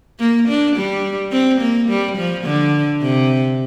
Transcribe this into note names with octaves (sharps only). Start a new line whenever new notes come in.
A#3
D4
G3
C4
A#3
G3
F3
D3
C3